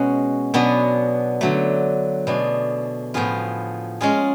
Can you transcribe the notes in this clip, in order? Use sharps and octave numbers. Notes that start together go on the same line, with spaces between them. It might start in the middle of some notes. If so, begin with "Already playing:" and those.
Already playing: B2 G#3 C#4 F#4
B2 F#3 B3 D4 G#4
D3 F#3 A3
B2 A3 D4 G#4
A2 F3 B3 F4 G#4
G#3 C#4 F4 G#4